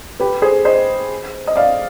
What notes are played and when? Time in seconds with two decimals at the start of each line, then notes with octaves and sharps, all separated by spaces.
0.20 G4 B4
0.42 G#4 C5
0.65 C5 D#5
1.47 D#5
1.56 D5 F5